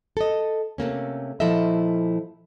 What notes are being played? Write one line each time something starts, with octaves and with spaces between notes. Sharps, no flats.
A4 D#5
C3 A3 A#3 C#4
A#2 F3 E4 A4 D#5 E5